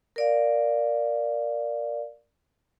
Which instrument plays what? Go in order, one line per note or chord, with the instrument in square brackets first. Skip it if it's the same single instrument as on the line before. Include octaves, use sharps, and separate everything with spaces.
[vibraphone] A#4 D5 F5